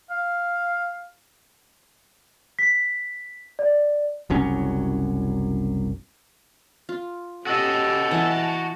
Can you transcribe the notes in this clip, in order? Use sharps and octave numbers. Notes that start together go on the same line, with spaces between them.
F5
B6
D5
F#1 C2 F#3 C#4
F4
C#4 F#4 G4 A4 D#5
E3 F#5 G#5 A5